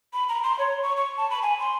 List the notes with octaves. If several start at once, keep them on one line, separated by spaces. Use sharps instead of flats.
B5
A#5
C6
C#5
C#6
C#6
A5
B5
G#5
C6